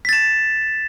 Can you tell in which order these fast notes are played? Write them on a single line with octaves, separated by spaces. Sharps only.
B6 A6 E7